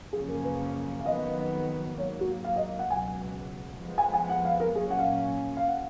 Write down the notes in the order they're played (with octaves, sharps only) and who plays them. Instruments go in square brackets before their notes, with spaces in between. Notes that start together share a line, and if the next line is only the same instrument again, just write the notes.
[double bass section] F#2 C#3 F3 A#3 C#4 [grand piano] G#4
[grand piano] A#4
B4
F5
[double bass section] F2 D#3 F#3 B3 [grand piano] D#5
[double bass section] G#2 F#3 A#3 [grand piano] C#5
[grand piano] F#4
F5
D#5
F#5
[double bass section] C#2 B2 F#3 [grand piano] G#5
[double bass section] F2 F3 G#3 B3
[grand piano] G#5
G#5
F#5
F5
A#4
[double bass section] A#2 F#3 A#3 C#4 [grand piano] G#4
[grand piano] F#5
F5
F5
F#5